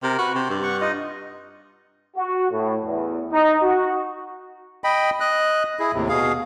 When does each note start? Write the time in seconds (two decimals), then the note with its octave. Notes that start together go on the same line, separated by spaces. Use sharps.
0.03 C3 A#4
0.19 F#4 B4
0.35 C3 C5
0.50 G2
0.63 F#5 C#6
0.81 D#4 F4 D#5
2.16 F#4
2.51 A2
2.84 E2
3.31 D#4
3.62 F#4
4.84 D#5 G5 B5
5.20 D#5 F#6
5.79 E4 G#4
5.94 D#2 A2 C3
6.09 B2 G#4 F5